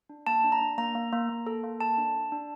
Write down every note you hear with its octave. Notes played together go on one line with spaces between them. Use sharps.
D4
A#3 A5
D4
A#5
D4
A#3 A#5
A#3
A#3
A#3
A4
A#3
A4 A5
D4
D4
D4